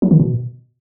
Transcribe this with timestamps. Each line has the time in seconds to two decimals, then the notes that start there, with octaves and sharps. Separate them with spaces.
0.02 F#3
0.11 D#3
0.20 B2